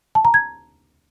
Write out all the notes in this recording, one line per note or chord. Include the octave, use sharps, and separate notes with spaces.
A5
A#5
G#6